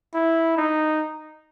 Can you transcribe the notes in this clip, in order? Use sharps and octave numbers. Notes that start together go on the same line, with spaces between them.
E4
D#4